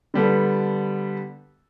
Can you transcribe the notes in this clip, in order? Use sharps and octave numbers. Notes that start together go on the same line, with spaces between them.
D3 G3 B3 A4